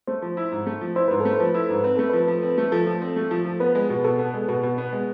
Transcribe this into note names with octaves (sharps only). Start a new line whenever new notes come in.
A3 C5
F3
E4
G#2
A3
F3
E4 C5
G#2 B4
A3 A4
B4
F3
E4
G#2
C4 B4
A3 A4
F3 B4
F3
C4
A3
F3 A4
F3
C4
A3
F3
F3
B3 B4
G#3
B2
B2 A4
B3
G#3
B2 B4
B2
B3
G#3